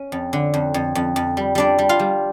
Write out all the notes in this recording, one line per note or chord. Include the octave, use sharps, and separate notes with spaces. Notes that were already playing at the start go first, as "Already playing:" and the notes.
Already playing: C#4
F2
D3
F2
F2
F2
F2
G3
G3 D4 D5
G3
F4 F5
G3